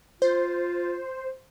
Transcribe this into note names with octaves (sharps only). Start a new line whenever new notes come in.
F4 C5